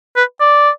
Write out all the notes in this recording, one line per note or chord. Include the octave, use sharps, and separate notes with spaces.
B4
D5